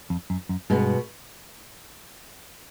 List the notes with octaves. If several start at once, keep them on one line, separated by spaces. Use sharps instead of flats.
F2
F#2
F#2
G2 B2 G#3 B3